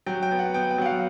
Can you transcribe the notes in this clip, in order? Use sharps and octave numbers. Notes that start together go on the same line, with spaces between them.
F#3 G5
G5
B3
F#5
B3 G5
G5
F#3 F#5
F5